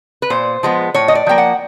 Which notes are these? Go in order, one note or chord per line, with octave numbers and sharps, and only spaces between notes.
B4
A#2 C5
F3 G#3 B3
A2 C#5
D#5
D5
F3 A#3 G5
F#5